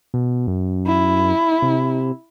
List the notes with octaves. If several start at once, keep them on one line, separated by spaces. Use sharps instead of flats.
B2
F#2
E4
C3